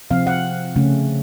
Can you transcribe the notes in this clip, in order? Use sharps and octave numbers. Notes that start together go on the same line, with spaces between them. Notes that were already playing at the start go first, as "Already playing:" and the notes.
C3 F3 C4 F5
F#5
C#3 A3 C#4